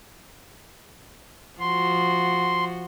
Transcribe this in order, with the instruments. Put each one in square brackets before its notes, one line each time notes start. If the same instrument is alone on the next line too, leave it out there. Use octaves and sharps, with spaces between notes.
[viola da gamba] F3 F#4 [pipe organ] C6